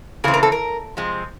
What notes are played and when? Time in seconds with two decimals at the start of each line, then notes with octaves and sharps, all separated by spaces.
0.24 C#3 E3 A3 C4 G#4
0.34 A#4
0.43 A4
0.52 A#4
0.97 C3 F3 G#3 C4